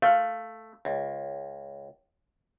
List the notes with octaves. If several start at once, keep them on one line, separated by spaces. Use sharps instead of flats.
A3 F5
C#2